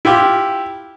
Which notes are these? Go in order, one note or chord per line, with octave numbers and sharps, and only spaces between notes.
E4 F4 G4